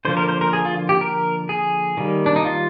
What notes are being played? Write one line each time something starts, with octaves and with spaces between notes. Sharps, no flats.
D3 F3 A#3 C5
A#4
C5
A#4
G#4
F4
G4
A#4
G#4
D#3 G3 A#3
D4
D#4
F4